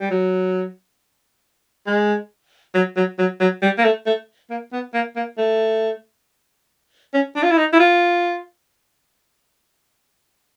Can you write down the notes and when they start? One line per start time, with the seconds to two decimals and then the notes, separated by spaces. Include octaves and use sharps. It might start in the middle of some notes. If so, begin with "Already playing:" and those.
0.01 G3
0.11 F#3
1.87 G#3
2.75 F#3
2.96 F#3
3.19 F#3
3.40 F#3
3.62 G3
3.78 A#3
3.84 A3
4.06 A3
4.50 A#3
4.72 B3
4.94 A#3
5.16 A#3
5.38 A3
7.14 C#4
7.36 D4
7.43 F4
7.51 E4
7.58 D#4
7.73 E4
7.80 F4